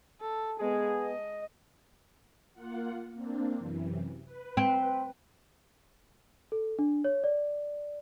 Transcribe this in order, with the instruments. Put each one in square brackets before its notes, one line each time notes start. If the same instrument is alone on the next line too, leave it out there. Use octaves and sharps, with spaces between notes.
[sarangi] A4
[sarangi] G#3 [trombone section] B3 G#4
[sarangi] D#5
[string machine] A#3 F4 F#5
A#3 C4 D4
F#2 C3 E3
B4
[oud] C4
[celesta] A4
D4
C#5
D5